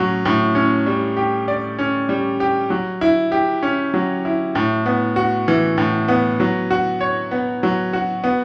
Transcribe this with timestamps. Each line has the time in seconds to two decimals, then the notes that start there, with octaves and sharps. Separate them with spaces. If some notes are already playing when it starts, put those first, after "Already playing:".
Already playing: A2 F#3 C#4
0.25 A2
0.55 C#4
0.86 G3
1.17 G4
1.48 D5
1.78 C#4
2.09 G3
2.40 G4
2.70 F#3
3.01 E4
3.32 G4
3.63 C#4
3.94 F#3
4.25 E4
4.55 A2
4.86 B3
5.16 F#4
5.48 E3
5.78 A2
6.08 B3
6.40 F#3
6.71 F#4
7.01 C#5
7.31 B3
7.63 F#3
7.93 F#4
8.24 B3